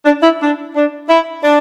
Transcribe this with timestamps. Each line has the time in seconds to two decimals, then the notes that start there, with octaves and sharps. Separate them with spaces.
0.05 D4
0.22 E4
0.41 D4
0.75 D4
1.09 E4
1.44 D4